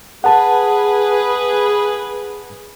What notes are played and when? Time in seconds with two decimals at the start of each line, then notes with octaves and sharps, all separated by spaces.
0.24 G#4 B4 F#5 A5